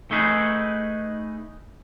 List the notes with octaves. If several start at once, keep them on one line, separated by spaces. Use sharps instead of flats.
A3 D#4 G#4 B4